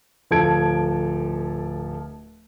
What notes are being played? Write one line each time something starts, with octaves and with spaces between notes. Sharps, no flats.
D1 F3 A4 G#6 D7